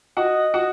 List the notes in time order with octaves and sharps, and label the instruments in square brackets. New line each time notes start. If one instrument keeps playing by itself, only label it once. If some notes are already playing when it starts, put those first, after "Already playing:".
[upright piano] F#4 F#5 [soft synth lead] D#5
[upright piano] F#4 F#5